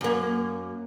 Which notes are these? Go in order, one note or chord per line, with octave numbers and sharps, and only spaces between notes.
F#2 A#3